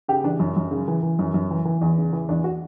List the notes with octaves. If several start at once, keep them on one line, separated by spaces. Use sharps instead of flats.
C#3 G4
E3 D4
F#2
F#2
C#3
E3
E3
F#2
F#2
E3
E3
E2
C#3
E3
E2 D4
F#4